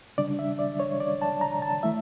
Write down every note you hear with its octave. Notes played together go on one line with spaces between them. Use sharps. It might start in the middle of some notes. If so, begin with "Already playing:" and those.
C#3 G3 D4 D5
E5
D5
C#5
D5
A5
A#5
A5
E3 A3 E4 E5